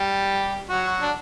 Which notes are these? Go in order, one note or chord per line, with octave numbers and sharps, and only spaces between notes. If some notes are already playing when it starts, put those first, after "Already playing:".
Already playing: G3 G4
F#3 F#4
D4